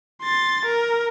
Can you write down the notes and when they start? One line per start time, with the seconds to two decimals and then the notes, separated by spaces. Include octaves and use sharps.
0.23 C6 A6
0.65 A#4